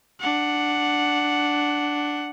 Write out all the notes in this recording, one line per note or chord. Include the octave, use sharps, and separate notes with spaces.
D4 F#5